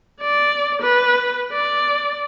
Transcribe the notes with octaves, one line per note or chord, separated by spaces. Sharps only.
D5
B4
D5